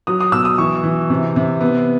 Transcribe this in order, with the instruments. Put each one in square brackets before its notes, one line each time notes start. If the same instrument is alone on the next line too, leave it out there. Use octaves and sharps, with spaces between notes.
[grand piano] F#3 D#6
D#6
B2 E6
D#6
E3 C#6
E3
C3
C3
B3